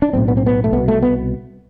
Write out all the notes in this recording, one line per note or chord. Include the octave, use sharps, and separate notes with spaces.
D4
B1 A2 C4
B3
C4
B3
A3
C2 B2 B3
A3
B3